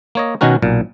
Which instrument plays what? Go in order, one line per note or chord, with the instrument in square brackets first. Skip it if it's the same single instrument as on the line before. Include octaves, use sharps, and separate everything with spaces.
[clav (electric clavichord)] A#3 C#5 D#5
B2 D#3 C#4 F#4 A#4
B1 A#2